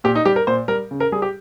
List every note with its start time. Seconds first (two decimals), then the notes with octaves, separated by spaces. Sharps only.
0.04 A#2 G4
0.15 D#4
0.25 G3 G4
0.36 A#4
0.47 A#2 C5
0.68 G3 A#4
0.91 C#3
1.00 A#4
1.12 G3 G#4
1.22 G4